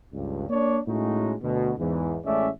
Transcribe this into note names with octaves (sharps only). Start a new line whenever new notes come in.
C#2 G2
A#3 D4 C#5 D5
A2 G#3 A3 C#4 D#4 F#4
D2 B2
E2 G#2 E3
A1 G#3 A3 C#4 D5 E5